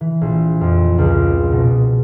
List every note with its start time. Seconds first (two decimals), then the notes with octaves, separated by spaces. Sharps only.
0.01 E3
0.21 A#1
0.61 F2
0.98 C#2
1.52 B2